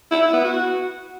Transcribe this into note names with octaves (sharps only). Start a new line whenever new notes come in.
E4
E4
B3
F#4